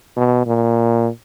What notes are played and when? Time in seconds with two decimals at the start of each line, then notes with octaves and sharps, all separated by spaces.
0.16 B2
0.46 A#2